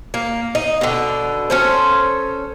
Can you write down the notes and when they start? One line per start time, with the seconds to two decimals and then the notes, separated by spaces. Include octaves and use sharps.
0.14 A#3
0.55 D#4
0.81 B2 D3
1.50 C#4 A4 C5